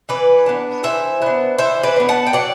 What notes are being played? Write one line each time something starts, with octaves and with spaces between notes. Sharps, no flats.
E3 B4 D5
B3 D4
E3 C5 E5
B3 D4
E3 C5 E5
B4 D5
B3 D4
F#5 A5
G5
F#3 D5 F#5